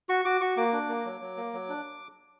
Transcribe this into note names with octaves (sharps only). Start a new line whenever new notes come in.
F#4 C#6
F#4 D6
F#4 C#6
A#3 D6
D4
A#3
F#3
F#3
A#3
F#3
D4